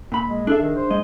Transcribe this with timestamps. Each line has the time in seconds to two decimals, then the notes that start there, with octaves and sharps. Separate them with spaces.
0.12 A#2 B5
0.28 G#3
0.47 D4 G#4 A4 E5
0.60 D#3
0.76 C5
0.91 G#2 G#3 D#5